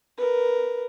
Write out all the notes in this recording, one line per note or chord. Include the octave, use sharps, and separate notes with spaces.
A#4 B4